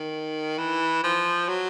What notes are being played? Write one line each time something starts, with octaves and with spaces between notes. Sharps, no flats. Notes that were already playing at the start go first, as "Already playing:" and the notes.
Already playing: D#3
E3
F3
F#3